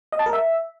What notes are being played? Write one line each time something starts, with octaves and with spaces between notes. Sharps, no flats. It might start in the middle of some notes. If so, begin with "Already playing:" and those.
D#5
A5
A#4
E5